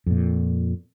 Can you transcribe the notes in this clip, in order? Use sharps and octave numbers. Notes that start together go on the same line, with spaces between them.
F2 A#2